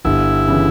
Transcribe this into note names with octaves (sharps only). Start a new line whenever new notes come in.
G1 E4
C#3 E3